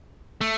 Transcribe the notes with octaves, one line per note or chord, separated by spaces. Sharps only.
A3